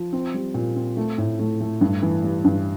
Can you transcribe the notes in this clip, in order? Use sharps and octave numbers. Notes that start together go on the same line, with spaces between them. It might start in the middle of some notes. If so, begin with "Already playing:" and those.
Already playing: F3
C4
G3
A#2
C4
A3
A2
A3
A3
G2
E3
G3
G2